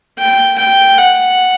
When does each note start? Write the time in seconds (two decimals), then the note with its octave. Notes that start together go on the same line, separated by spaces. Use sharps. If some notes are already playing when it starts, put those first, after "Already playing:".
0.19 G5
0.58 G5
0.98 F#5